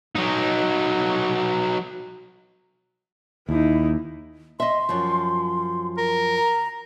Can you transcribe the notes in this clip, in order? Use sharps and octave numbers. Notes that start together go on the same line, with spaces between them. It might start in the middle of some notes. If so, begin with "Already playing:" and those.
F#3 D#4
D#2 D#4 E4
D#5 E5 C6
F#2 F3
A#4
A#5